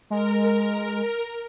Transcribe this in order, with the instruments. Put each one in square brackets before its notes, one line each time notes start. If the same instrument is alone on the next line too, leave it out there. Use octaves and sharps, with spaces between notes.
[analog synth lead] G#3 [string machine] A#4